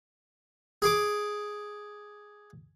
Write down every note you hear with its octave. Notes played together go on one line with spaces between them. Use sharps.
G#4 D6